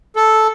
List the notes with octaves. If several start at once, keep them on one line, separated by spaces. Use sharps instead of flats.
A4